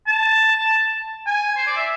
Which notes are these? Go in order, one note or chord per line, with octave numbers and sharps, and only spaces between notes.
A5
G#5
C5
D5
E5